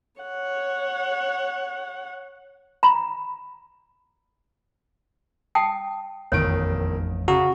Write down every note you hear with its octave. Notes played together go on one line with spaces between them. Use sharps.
C#5 F#5
A#5 B5
G5 A5 D#6 C7
E1 A1 F2 D#3 F3 C#5 D7
C#3 F#4 A#5